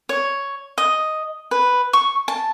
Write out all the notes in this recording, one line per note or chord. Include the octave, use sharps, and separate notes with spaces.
C#5
D#5
B4
C#6
A5